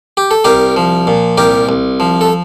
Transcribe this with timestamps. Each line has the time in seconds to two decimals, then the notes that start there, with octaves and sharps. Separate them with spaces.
0.17 G4
0.31 A4
0.44 C2 G4 A#4
0.76 F3
1.07 A#2
1.38 C2 G4 A#4
1.69 C2
2.00 F3
2.21 A4